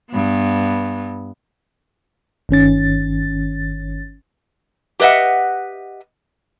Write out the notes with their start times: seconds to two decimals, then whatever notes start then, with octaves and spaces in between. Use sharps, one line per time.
0.11 G2 B3
2.49 G1 D#3 C#4 A6
5.00 G4 B4 D#5 E5 F#5